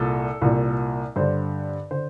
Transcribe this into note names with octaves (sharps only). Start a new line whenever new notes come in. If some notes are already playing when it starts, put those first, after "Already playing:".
Already playing: C2 A#2 A4
C2 A#2
G2 D3 C5
D3 C5